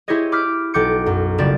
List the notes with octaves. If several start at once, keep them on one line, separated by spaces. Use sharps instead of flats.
E4 G4 G#4 C5 C#5 D#5
B5 D6 E6 F6 G6 B6
B1 A4 G5 D6 G6 C#7
F#2
F#1 G3 F4 D5 E7